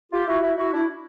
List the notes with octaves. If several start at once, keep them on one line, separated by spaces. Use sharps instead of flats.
F4 G4
E4 F#4
E4 F#4
E4 F#4
D4 E4